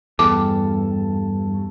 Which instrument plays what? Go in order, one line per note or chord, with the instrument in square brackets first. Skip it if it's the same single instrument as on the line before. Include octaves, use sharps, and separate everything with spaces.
[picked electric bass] E2 [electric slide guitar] G2 [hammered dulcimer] A4 A5 [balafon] D6